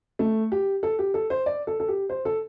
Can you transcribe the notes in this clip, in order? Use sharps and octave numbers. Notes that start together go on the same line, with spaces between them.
A3
G4
A4
G4
A4
C5
D5
A4
A4
G4
C5
A4